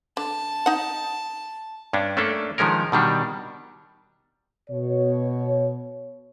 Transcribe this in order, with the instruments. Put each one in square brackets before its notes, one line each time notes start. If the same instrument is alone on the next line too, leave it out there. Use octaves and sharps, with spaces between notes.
[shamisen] D3 [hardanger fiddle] A5
[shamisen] D#4 F#5
[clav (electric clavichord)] G2 C#4 D4
A3 A#3 C#4 D4 A4
D#3 F3 G#3 C#4 A#4
B2 D#3 G3 D4
[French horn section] B2 C#5